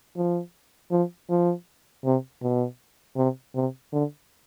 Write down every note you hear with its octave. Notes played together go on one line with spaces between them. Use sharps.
F3
F3
F3
C3
B2
C3
C3
D3